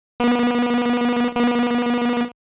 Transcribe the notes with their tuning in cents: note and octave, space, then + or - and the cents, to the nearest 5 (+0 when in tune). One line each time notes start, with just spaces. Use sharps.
B3 -35
B3 -40